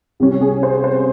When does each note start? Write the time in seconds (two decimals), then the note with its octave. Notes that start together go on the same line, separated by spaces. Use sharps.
0.20 C2 C3 G3 C#4 G4
0.41 G#4
0.63 C5
0.84 C5